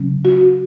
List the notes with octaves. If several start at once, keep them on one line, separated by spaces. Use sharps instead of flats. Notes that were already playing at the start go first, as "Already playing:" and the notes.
Already playing: C#3 F#3 C#4
F#4